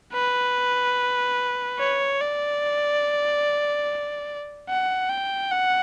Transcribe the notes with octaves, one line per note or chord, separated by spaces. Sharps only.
B4
C#5
D5
F#5
G5
F#5